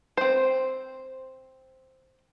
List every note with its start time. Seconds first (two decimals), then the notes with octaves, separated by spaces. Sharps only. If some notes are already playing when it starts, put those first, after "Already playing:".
0.17 C4 C5